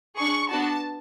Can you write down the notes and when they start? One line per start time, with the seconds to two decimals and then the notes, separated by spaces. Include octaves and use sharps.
0.16 D4 G#4 C#6
0.50 B3 D4 F#4 A5